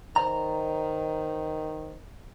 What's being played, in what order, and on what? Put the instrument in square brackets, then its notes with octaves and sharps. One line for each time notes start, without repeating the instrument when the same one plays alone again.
[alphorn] D#3 [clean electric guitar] C5 D5 A#5